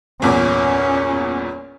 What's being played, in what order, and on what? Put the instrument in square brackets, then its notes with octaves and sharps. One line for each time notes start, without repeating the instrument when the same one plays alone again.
[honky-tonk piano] G1 E2 A#2 [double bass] C#4